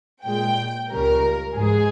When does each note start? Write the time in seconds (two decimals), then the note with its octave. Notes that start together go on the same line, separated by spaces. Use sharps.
0.24 A#2 G#3 G5
0.90 C#2 C#3 G3 A#4
1.55 G#2 E3 G#3 G#4